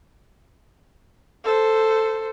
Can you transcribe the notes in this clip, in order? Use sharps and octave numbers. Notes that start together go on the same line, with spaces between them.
A4 C5